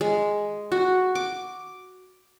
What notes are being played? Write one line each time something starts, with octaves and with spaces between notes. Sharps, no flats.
G#3
F#4
D6